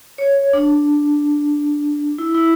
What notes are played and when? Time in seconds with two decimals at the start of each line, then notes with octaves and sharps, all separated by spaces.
0.18 C#5
0.53 D4
2.18 E4
2.34 E4